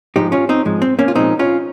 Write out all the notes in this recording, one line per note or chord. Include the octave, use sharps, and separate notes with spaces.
G#2 F3 G#3 D#4 G4
C#4 F4
C4 D#4
G#2 F3 G#3
C4
A#3 C#4
F4
A#2 F3 G#3 C4 D#4
C#4 F4